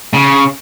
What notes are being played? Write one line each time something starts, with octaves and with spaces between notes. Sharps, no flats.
C#3